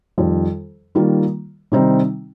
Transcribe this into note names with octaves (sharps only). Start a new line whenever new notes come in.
F2 D#3 G3
D#3 G3 A#3 F4
C3 D#3 G3 C4 D#4